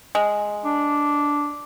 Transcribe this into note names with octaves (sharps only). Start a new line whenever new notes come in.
G#3
D4